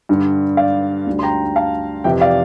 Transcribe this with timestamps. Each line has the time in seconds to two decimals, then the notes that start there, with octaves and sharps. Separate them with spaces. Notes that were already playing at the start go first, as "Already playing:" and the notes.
0.09 G2 D3 G3
0.57 D5 F5
1.07 D2 D3 G3
1.19 C6
1.23 G5 A#5
1.56 F5 A5
2.04 F2 C3 E3 E5 G5
2.21 D5 F5